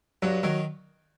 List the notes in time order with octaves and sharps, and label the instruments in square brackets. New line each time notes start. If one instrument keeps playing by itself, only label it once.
[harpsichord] G2 [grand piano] F#3
[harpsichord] D#3 [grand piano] F#3